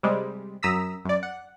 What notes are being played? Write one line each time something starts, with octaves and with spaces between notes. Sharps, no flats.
C3 G3 G#3
F#2 A#5 D#6 E6 B6
F#2 D5
F#5